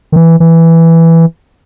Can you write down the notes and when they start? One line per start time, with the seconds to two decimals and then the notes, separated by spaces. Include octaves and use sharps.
0.12 D#3
0.16 E3
0.40 E3